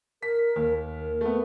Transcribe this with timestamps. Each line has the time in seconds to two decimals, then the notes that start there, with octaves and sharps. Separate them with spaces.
0.23 A#4 B6
0.56 D#2
1.00 A#4
1.21 A3 B3